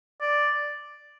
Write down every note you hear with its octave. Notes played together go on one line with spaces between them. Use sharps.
D5